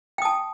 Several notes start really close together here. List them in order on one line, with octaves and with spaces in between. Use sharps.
G5 D#6 A5